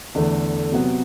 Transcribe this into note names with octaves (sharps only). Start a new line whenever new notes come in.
E2 D3 A3
C3 F#3 B3